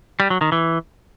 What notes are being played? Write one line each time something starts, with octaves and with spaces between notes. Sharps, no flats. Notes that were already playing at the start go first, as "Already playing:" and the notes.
G3
F#3
D#3
E3